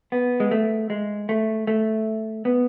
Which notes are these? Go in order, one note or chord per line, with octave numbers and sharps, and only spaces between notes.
B3
G#3
A3
G#3
A3
A3
B3